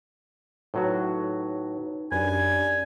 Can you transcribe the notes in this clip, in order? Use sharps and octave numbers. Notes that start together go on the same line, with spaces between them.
A2 F#3 D#4 F#4 B4
F#2 D4 G4 B4 D5 G#5